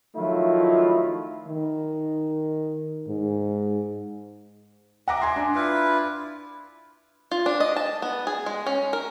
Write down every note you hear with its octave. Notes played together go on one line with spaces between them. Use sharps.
D#3 F3 F#3 A3 E4 F4
D#3
G#2
D#5 E5 F#5 A#5 D6
G#5 C6
D4
E4 F4 B4
F4
D4
D#5
A5
B3
G#4
G#3
C#4
A#4